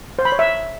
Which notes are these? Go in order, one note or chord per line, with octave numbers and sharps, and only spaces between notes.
C5
B5
C#5
E5